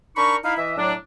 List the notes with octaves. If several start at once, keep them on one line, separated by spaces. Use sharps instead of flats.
D4 D#4 A#4 B5 C#6
D#4 E4 F5
E3 D#5 E5
A2 F#3 D4